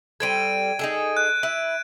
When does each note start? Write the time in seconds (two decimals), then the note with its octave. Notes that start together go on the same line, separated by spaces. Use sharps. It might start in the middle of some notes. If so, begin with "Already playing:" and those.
0.20 G3 C4 A4 G#6 D7 D#7
0.79 D#4 G#4 A4
1.17 F#6
1.43 E4 D7